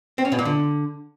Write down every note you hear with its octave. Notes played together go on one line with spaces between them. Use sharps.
C4
C#4
B2
A#2
D3